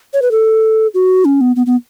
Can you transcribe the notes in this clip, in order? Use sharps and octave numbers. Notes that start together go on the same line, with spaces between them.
C#5
B4
A4
F#4
C#4
B3
B3
B3